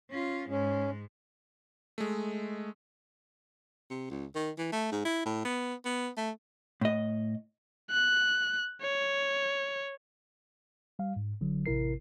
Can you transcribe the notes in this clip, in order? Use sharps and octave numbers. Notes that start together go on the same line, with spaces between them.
C#4 F4
G#2 G#3 C#4
G#3 A3
C3
C#2
D#3
E3
A3
G#2
E4
A2
B3
B3
A3
A2 D#5
F#6
C#5
G3 F5
G#2
G#1 D3 F#3
A1 C3 E4 A#4 C7